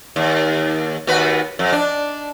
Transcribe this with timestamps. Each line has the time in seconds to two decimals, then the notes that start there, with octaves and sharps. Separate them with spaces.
0.16 D#2
1.07 D#2 F#4 B4
1.59 F2
1.72 D4